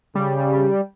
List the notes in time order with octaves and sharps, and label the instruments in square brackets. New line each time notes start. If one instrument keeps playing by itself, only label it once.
[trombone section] C#3 [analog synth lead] G3